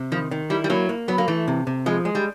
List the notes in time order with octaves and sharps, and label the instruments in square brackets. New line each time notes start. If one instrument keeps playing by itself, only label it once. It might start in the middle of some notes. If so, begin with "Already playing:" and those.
Already playing: [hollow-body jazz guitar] C3
[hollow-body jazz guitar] D#3 [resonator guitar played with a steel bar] F3
[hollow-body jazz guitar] D#3
[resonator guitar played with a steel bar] G3 [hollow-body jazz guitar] E4
[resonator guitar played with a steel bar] G3
[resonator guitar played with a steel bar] F#3 [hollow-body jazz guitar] A#3
[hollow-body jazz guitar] A#3
[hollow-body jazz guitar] F#3 [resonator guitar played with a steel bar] B3
[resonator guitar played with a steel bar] A#3
[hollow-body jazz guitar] E3 [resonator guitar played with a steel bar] A3
[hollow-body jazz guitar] C3
C3
[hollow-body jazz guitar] F3 [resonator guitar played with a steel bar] G#3
[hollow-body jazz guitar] G#3
[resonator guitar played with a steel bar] G3